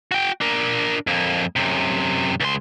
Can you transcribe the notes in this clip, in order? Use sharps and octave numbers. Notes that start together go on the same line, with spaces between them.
F#4 G5
D4 A#4
F2 A#3
F#2 C3
C#2 C6